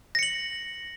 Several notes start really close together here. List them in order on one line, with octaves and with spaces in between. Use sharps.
A#6 C#7 F#7